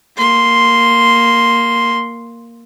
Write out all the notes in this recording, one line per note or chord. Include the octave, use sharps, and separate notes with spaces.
A#3 C6